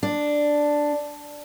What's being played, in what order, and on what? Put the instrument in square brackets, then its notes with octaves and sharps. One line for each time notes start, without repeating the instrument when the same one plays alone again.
[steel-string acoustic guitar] D4